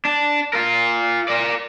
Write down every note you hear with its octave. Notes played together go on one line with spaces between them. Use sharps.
D4
F4 A#4
A#4 D5